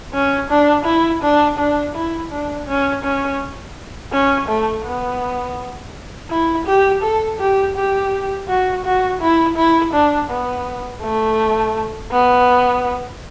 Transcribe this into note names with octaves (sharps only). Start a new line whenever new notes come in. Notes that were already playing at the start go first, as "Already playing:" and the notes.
C#4
D4
E4
D4
D4
E4
D4
C#4
C#4
C#4
A3
B3
E4
G4
A4
G4
G4
F#4
F#4
E4
E4
D4
B3
A3
B3